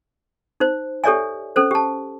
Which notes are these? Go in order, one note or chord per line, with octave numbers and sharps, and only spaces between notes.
D#4 C5
G4 A4 C#5 D5 E5 G#5
C#4 A4 C5
G4 A5